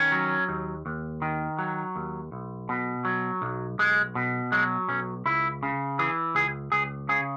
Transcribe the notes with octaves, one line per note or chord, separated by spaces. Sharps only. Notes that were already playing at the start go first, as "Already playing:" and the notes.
Already playing: D#3 C#4
F#3
D#2
D#2
D#3
F#3
D#2
B1
B2
F#3
B1
B1 G#3
B2
F#3 G#3
B1 C#4
C#2 E4
C#3
E3 G#4
C#2 G#4
C#2 G#4
C#3 G#4